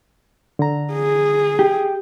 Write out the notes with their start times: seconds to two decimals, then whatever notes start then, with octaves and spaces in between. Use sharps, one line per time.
0.59 D3 A#5
0.93 G#4
1.59 G4